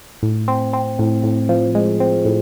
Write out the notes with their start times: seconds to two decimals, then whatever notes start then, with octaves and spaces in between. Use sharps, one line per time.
0.23 A2
0.48 C4
0.73 C4
0.99 A2
1.24 A2
1.49 F3
1.75 G#3
2.00 C4
2.25 A2